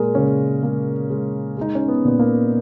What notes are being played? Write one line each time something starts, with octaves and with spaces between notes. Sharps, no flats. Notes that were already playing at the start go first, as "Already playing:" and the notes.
Already playing: A#2 G#3 G#4 A#4
C#3 G#3 C#4
G#3 A#3
G#3
G#3 D#4
C#4
B3
A#2 B3
A#3